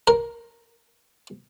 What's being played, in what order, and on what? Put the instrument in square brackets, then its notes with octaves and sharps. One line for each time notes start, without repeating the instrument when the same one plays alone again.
[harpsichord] A#4